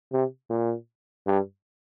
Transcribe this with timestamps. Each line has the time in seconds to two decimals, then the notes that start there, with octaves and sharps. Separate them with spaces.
0.12 C3
0.50 A#2
1.27 G2